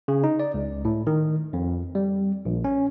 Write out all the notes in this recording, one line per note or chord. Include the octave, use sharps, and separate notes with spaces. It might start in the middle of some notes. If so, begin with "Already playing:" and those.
C#3
D#4
D5
C#2
A2
D#3
F2
G3
A#1
C#4